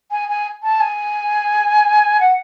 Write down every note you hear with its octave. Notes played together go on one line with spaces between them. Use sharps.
G#5
G#5
A5
G#5
F#5